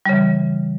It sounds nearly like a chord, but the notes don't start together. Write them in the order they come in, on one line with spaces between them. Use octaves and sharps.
G3 C#3 E3